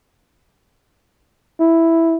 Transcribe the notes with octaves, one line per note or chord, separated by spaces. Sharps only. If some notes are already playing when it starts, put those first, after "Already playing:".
E4